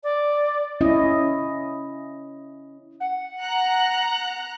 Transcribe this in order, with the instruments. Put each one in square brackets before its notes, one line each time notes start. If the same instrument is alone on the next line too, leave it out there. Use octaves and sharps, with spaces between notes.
[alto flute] D5
[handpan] C#4 E4 D#5
[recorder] F#5
[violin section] A#5 F#6